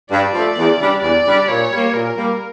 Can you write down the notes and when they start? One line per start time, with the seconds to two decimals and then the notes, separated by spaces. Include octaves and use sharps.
0.11 G2 D5
0.33 F3 A3
0.57 E2
0.80 C#3 G3 D4 G4
1.02 E2 D5
1.26 C#3 G3 D4 G4
1.48 A#2 C#5
1.71 G3 A#3
1.93 A#2 A#4
2.16 G3 A#3